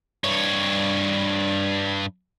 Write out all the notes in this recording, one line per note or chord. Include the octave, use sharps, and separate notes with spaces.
G2 C#5